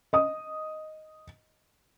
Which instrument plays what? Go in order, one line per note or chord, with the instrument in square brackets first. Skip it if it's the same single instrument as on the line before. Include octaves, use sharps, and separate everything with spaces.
[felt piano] D#5 D#6